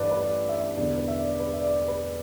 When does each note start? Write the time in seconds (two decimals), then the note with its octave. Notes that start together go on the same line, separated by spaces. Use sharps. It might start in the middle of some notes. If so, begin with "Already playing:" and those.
Already playing: A1 G2 E3 B4 D5
0.11 B4
0.21 D5
0.49 E5
0.77 E1 E2 D3 D5
0.97 B4
1.08 E5
1.19 D5
1.34 D5
1.40 B4
1.53 E5
1.61 D5
1.88 B4